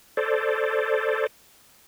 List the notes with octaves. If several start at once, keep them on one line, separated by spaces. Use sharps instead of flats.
A4 C5 D5